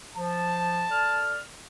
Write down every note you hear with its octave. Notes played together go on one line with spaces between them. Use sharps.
F3 A5
A4 D5 F6